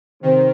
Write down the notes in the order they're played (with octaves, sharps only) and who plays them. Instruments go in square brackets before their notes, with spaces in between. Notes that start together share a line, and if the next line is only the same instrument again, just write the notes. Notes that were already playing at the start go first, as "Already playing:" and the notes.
[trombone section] C3 C4 [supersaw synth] D#3